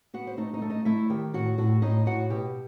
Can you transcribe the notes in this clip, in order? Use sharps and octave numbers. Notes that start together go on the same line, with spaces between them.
B3 F#4 F#5
C5
A3 D#4 D#5
D#4 D#5
A3
D#4 D#5
A3 E4 E5
D#3 G4 G5
A2 F#4 F#5
A2 F#4 F#5
A2 D#4 D#5
A2 F#4 F#5
B2 G4 G5